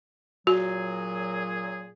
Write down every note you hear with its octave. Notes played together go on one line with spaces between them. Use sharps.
A#2 F#3 F#4 G#4